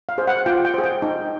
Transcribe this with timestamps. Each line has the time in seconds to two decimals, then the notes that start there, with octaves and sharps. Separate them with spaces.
0.09 F5
0.18 G#4 C5
0.27 F#5
0.46 F4 G5
0.65 G5
0.74 G#4 C5
0.84 G5
1.02 D#4